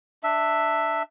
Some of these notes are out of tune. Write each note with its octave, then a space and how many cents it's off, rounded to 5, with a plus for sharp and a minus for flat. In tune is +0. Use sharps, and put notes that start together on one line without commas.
D4 +20 E5 +0